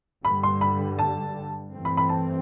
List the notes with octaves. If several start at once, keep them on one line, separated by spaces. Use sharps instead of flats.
G2 D3 G3 B5
C6
B5
A5
G2 E3 A3 C4
B5
B5
A5